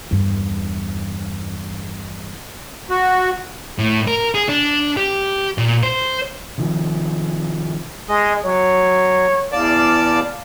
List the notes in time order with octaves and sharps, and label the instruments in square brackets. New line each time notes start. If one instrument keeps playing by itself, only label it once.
[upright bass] E2 G2
[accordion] F#4
[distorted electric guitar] A2
A#4
G#4
D4
G4
A#2
C5
[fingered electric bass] C3 D#3 F3
[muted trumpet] G#3 [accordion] D#5
[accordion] F#3 [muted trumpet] C#5
[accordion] E2 D5 A5 [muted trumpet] F5